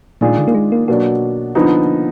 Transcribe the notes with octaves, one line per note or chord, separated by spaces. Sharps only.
A#2 D#3 G#3 D4 F4 G#4
D3
A#3
G#3
A#3
B2 F#3 A#3 D4
D3 F3 B3 D#4